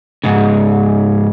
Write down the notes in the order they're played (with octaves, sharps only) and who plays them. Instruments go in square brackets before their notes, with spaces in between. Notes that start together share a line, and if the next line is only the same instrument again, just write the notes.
[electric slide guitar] G#2 C#3